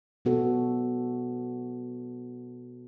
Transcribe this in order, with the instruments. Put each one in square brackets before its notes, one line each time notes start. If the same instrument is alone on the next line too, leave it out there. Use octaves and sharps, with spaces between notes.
[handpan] B2 B3 F#4 A4